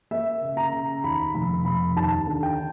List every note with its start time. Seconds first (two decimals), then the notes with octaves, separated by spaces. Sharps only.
0.11 A#3 E5
0.42 C#3
0.57 A#5
0.73 C#3
1.04 D#2 B5
1.34 F1 B5
1.65 F1 B5
1.96 D#2 A5
2.27 D3
2.43 G5